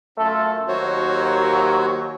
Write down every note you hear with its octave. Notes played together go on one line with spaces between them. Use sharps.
F#2 A3 F4 A4
D#2 F#3 F#4 C5 C#5